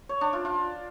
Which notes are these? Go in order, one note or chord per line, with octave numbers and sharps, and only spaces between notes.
C#5
D4
F4
F4